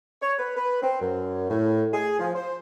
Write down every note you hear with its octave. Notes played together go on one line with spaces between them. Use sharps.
C#5
B4
B4
C4
F#2
A2
G#4
F3
C5